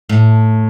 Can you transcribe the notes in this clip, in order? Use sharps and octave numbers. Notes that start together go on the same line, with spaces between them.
A2